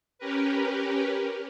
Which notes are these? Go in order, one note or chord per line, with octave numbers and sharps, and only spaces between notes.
C#4 G4 A#4 B4